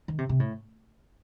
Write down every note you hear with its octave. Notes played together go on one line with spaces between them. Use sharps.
D#3
C3
C3
A2